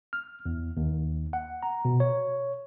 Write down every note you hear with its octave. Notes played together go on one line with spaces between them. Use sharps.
F6
E2
D#2
F#5
A#5
B2
C#5